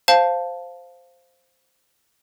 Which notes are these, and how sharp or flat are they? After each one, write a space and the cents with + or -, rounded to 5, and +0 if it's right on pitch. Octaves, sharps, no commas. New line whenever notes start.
C5 +0 F5 +0 A5 +0